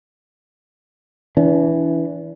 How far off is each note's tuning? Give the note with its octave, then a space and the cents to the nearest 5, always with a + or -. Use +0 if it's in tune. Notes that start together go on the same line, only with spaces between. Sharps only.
E3 +0 D4 -40